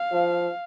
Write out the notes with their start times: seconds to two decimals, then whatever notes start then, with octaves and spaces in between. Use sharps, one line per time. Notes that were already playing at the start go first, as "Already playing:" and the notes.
Already playing: F5
0.12 F3